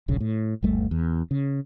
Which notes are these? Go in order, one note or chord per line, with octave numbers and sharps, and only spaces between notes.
D#1 B1 C#3
A2
G1 D#2 G3 A3
E2
C#3